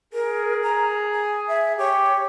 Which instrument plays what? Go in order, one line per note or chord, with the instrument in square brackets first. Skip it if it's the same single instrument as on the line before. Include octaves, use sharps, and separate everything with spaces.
[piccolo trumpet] G#4 [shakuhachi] A#4
[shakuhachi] A#5
G#5
E5
[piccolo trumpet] G4 [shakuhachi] C#5